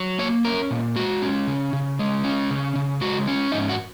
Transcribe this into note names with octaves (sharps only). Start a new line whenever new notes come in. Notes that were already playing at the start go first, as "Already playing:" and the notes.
Already playing: F#3
A#3 C#5
C#4 A#4
A#2
G#3 F#4
C#4
C#3
C#3
G#3
C#4
C#3
C#3
G#3 F#4
C#4
G#2 D#4
F#4